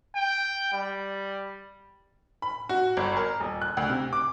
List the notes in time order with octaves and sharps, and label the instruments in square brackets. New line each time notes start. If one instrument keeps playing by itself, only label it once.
[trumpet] G5
G3
[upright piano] B5
F#4
G1
A#4
D#1
F#6
D2
C3
D6